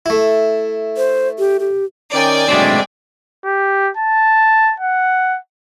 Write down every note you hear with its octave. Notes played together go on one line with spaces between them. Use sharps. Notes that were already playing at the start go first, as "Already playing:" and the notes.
A3 E4
C5
G4
G4
D#3 C#4 A#4 D5 G5 G#5
B2 F#3 G#3 A3 C4 D4
G4
A5
F#5